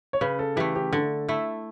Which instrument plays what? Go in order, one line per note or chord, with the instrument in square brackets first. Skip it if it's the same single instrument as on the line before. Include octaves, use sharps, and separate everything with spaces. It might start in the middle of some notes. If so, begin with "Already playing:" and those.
[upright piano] C#5
[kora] C#3 [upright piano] B4
[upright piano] A4
[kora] E3 A3 [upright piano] G4
[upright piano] G4
[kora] D3 [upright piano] A4
[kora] A3 E4